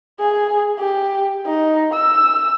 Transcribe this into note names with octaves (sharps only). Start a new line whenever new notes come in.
G#4
G4
D#4
E6